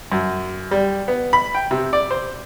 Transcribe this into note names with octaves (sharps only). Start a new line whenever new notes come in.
F#2
G3
B3
B5
G5
C3
D5
C5